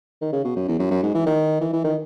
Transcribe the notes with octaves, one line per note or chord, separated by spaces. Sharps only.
D#3
C#3
B2
F#2
E2
F#2
F#2
G#2
E3
D#3
E3
E3
D#3